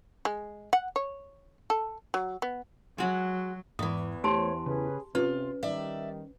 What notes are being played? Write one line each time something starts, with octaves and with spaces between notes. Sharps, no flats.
G#3
F#5
C#5
A4
F#3
B3
F#3 G#3 F#4
E2 G#2 E3 D#6
A3 G4 C5 C#5 A5 C6
C#3 C#4 G#4 B4
C3 C#4 F4 B4
D#3 G3 D5 E5